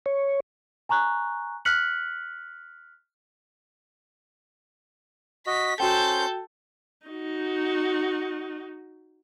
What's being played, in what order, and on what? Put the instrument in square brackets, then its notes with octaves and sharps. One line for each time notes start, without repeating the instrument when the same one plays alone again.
[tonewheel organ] C#5
[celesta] G#5 A#5 C#6 F#6
F6 F#6 B6 C#7 F#7
[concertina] F#4 D#5 [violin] B6
[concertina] C#4 C5 [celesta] F#4 G5 [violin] A4 G6
[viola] D#4 F#4